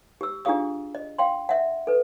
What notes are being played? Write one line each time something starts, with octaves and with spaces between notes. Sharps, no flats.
G4 E6
D4 F4 G4 G#4 F5 D#6
D#5
F5 G5 C6
E5 F#5
A4 B4